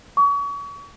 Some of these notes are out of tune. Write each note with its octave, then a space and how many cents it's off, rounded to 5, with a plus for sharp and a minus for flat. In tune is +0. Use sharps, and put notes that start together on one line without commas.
C#6 +35